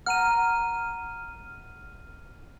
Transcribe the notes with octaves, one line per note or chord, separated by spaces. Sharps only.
F#5 A#5 F6 D#7